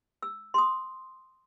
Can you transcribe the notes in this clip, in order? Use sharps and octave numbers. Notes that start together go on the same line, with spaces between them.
E6
C6 D#6